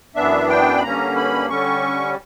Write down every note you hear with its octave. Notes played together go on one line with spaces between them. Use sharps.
F#2 E3 B3 D4 E5
G5
B5
G2 D3 A#3 C#4 A#5
B5
D3 G3 C#4 C#6